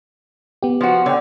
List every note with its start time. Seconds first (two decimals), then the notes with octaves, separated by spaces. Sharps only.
0.63 B3 G4
0.81 F3 F#4
1.06 D3 C#5 F#5 G5